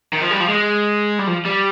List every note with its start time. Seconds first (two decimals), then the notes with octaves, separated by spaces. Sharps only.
0.13 D#3
0.22 F3
0.31 G3
0.40 F3
0.49 G#3
1.19 G3
1.27 F3
1.45 G3